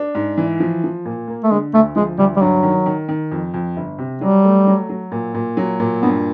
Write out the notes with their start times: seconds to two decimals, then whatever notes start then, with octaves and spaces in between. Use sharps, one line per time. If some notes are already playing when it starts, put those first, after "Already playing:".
Already playing: D4
0.15 G#2
0.38 E3
0.60 F3
0.84 F3
1.05 A#2
1.28 A#3
1.44 A3
1.51 D3 G#3
1.73 D2 A3
1.96 F3 G#3
2.18 D2 G3
2.37 G3
2.41 G2 F#3
2.63 D#3
2.86 D#3
3.09 D#3
3.32 F2
3.54 F2
3.77 G1
3.98 C3
4.21 F#3 G3
4.44 A3
4.67 F#3
4.89 F#3
5.12 A#2
5.34 A#2
5.57 F#3
5.80 A#2
6.02 G2 B3